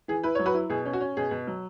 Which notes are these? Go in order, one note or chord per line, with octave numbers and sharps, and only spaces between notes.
E3 G#4
E4 B4
F#3 C#5
F#4 B4
E4
B2 G#4
C#4
F#4
C#4
B2 G#4
B2
F#3